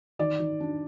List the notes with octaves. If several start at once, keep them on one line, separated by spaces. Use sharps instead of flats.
D#3 D5
D#3
D4